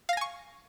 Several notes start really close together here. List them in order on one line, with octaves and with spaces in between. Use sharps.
F5 A#6 G#5 C#6